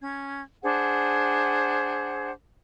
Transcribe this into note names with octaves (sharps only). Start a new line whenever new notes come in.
C#4 G#6
D4 G#4 C5 F#5